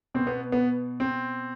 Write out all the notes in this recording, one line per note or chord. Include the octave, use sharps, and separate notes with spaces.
B2 C4
B3
B3
C4